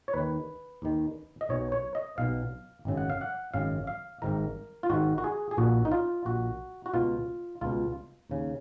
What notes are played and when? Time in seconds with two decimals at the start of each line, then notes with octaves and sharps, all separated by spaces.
0.08 C#5
0.13 D#2 D#3 B4
0.82 D#2 D#3
1.41 D#5
1.49 B1 B2 C#5
1.72 C#5
1.95 D#5
2.18 B1 B2 F5
2.85 G#1 F#2 C#3
2.97 F#5
3.10 F5
3.21 F#5
3.54 G#1 F#2 C#3 F5
3.87 F5
4.22 G#1 G#2 D#3 A#4
4.83 F4
4.90 G#1 G#2 D#3 F#4
5.18 F#4
5.24 G#4
5.51 G#4
5.57 A#1 A#2 F#4
5.85 D#4
5.92 F4
6.25 A#1 A#2 F#4
6.86 F#4
6.94 C#2 B2 F4
7.61 C#2 B2 F4
8.30 D#2 C#3